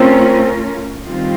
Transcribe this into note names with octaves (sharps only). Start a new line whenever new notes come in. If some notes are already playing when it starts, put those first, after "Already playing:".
Already playing: A3 C4 C#4 F4 A#4
D#3 G3 C4 F4